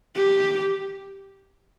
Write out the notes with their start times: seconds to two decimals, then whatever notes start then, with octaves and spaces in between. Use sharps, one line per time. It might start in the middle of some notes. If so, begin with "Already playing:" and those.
0.16 G4